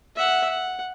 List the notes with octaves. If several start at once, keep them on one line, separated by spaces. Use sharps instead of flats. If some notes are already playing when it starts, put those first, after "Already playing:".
E5 F#5
F#5